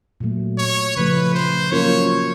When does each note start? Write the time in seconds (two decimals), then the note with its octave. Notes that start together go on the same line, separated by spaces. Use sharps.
0.20 A#2 F#3 A3
0.58 C#5
0.96 C#3 F3 A3 B4
1.34 C5
1.72 F#3 A#3 C#4 F4 A#4 C#5